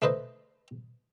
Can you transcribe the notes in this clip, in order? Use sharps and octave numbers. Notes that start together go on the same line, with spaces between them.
A3 D#4 B4 C5 D#5